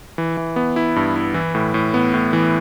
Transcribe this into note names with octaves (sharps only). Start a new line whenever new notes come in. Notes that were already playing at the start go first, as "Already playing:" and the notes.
E3
E3
B3
E4
G2
E4
E3
A2
A2
B3
A2
E3